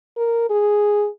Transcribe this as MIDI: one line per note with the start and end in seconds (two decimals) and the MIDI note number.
0.17 0.48 70
0.50 1.08 68